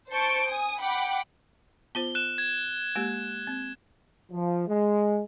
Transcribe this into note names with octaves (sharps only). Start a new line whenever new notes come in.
C5 A5 C#6 G6 C#7 D7
G#5 D#6
F#5 G5 B5 D6
B3 F4 C5 G7
F#6 E7
G#6
G#3 A#3 G4
C4
F3
G#3